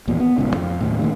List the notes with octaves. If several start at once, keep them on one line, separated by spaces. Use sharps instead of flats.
G#1 E2 A#2
B3
D#1 C#2 G#2 C#3
F2
D#2 A2
A#2 D#3 A3